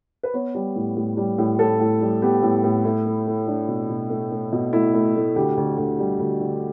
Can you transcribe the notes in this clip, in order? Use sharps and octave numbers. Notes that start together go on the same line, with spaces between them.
B4
B3 C#5
G3
A2
A2
G3
A2
A2 A4
A2
G3
B3 G4
A2
A2
A3 E4
A3
A3
A3 D4
B2
B2
A3
A3
B2
A3 E4
A3
A3
D2 G4
D2
D2
G3
D2
D3